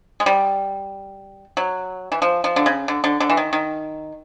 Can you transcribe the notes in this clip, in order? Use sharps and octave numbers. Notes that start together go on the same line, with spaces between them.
G#3
G3
F#3
E3
F3
F3
D3
C#3
D3
D3
D3
E3
D#3
D#3